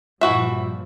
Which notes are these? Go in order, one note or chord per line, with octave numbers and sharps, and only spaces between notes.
G2 A#2 E3 F3 F#4 E5